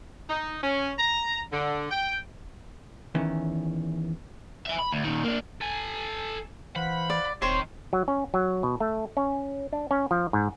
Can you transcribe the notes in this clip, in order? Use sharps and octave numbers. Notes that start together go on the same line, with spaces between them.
D#4
C#4
A#5
D3
G5
E2 D#3 E3 C#4
E5 G#5
B5
D2
A#2 D#3
A#3 D4
A4 G#5
E3 C5 F5 F#5 B5
D5
D#1 D#3 C4 C5 C#5 C6
F#3
C#4
F#3
B2
A3
C#4
D4
C#4
F3
G#2